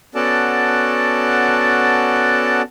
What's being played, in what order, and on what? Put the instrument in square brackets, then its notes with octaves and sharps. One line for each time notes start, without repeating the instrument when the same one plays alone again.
[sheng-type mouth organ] B3 C#4 F#4 A4 D5 A5